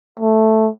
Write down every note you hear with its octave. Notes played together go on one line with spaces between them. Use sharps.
A3